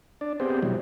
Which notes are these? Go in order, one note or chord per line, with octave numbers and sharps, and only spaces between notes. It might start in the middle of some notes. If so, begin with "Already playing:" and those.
D4 D5
B3 C4 G4 G#4 C5
B2 E3 F#3 G3